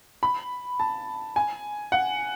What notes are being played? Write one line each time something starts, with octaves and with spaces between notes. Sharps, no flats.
B5
A5
G#5
F#5